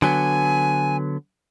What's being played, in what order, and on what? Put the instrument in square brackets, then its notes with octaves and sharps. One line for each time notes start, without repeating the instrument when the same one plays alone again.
[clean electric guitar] D3 F#3 B3 [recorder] G#5